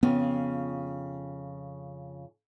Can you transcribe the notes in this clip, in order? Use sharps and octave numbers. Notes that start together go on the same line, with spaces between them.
F2 C#3 B3 F4